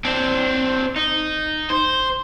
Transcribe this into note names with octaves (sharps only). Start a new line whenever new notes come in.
C4 D4
D#4
C5